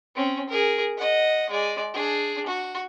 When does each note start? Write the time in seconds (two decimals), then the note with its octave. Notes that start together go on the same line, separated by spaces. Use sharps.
0.15 C4 C#4
0.49 G#4 A#4
0.98 D#5 F#5
1.50 G#3 D5
1.93 D4 G#4
2.46 F#4